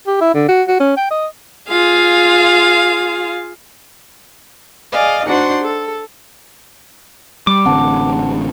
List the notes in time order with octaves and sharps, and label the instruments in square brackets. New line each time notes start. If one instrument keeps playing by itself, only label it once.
[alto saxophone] G4
E4
D3
F#4
F#4
C#4
G5
D#5
[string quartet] F4 G#4 F5
G#4 D5 D#5 F5
D4 D#4 F#4 C5 F#5 C6
A4
[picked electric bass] G3 [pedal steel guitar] D6
[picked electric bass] A1 D3 C4 [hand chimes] F#5 A5